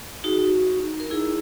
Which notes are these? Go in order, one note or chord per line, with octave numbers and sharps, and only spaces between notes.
D#4 F#4 G#4
F#4
D#4
A#4
D#4 E4 G#4